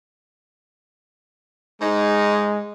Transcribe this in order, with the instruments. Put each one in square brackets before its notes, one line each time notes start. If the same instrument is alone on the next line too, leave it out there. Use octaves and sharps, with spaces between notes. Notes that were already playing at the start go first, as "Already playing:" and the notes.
[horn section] G#2 D#4 [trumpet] G#3